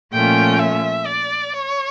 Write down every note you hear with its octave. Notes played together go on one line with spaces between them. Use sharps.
A#2 F3 A3 C#4 F4 G5
E5
D5
C#5